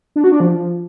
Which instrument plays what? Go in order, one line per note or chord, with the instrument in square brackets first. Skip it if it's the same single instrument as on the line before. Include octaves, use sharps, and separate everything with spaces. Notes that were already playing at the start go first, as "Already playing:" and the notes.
[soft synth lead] D4
F#4
D4
F3